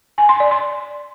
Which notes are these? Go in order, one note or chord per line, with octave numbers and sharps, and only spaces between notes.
G#5
C6
D5
C6